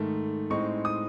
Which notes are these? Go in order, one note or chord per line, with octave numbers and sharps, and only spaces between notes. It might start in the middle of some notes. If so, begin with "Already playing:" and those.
Already playing: G#2 D#3 A3
A2 G#3 C4 D#4 C#6
D#6